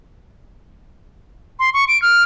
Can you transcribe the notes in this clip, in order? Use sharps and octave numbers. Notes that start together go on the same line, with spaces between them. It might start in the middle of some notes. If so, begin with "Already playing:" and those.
C6
C#6
D7
F6